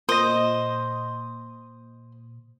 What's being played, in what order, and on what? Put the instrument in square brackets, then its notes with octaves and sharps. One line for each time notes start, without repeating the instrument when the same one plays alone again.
[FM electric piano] A#2 [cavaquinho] C5 [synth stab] D#5 D#6